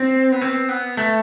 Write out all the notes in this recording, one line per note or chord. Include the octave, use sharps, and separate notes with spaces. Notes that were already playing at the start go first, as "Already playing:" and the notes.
Already playing: C4
B3
C4
B3
A3